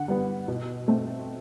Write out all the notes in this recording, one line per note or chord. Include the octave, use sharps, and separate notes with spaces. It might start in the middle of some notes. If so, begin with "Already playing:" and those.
Already playing: D3 F#5
G3 B3
B2
A3 C4